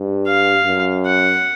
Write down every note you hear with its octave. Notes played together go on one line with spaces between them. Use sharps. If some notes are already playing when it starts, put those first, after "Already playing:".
Already playing: G2
F5
F#2
F#5